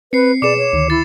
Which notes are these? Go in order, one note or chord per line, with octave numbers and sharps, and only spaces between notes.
C4 B4 C7 C#7
B2 G#4 B4 D5 D6 C#7 E7
C#5
D2 D#3
E4 A6